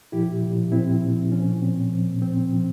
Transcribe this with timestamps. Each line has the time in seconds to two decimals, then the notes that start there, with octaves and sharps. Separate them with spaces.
0.12 A#2 F3 E4 G4
0.43 A#2 F3
0.72 A#2 F3 C4 E4
1.03 A#2 F3
1.32 A#2 F3 C#4
1.62 A#2 F3 C4
1.92 A#2 F3
2.22 A#2 F3 C4
2.52 A#2 F3